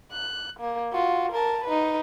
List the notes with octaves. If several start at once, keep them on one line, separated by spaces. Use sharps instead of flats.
F#6
A#3
F4 F#4
A#4 A5
D#4 B4